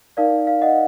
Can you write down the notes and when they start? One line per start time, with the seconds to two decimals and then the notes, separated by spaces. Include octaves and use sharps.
0.17 D#4 A#4 D5 F5
0.47 F5
0.61 D#5 F#5